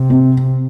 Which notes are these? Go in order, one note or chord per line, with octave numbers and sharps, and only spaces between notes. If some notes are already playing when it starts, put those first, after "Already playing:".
Already playing: C3
C4